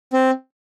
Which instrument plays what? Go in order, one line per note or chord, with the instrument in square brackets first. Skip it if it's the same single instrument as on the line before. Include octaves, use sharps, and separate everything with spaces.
[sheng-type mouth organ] C4